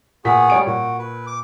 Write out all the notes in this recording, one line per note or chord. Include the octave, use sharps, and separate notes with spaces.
A#2 B3 F#4 G#4 B6
G3 C#5 D7
A#2 F#4
B4
D6